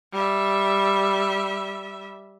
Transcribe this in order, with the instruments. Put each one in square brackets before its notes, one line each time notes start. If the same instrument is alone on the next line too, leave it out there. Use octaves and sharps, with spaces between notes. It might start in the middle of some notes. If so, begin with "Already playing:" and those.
[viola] G3 E5